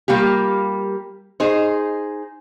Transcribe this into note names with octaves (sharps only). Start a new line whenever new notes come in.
G3 A#3 F4 G4
D#4 G#4 C5